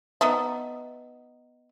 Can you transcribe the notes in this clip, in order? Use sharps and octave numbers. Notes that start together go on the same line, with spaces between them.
B3 D#4 E5